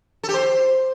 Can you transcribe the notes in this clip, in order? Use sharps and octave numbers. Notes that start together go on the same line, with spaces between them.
A4
G4
C5